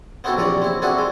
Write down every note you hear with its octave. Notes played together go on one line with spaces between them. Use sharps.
B3 C4 D#4 E4 F#4 A4
A#1 C3 E3 C#5 D5
C4 E4
C4 D4 E4 F#4 G#4 A4
G#3